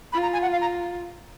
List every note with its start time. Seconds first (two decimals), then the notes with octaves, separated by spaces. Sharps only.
0.12 F4 B5
0.22 A#5
0.33 G#5
0.42 F#5
0.52 F5
0.61 A#5